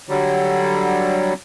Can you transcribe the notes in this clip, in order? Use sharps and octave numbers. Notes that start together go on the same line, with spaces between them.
D3 F#3 G3